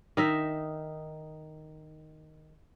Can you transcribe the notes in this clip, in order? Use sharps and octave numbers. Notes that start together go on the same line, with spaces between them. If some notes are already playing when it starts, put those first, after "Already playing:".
D#3 D#4 E5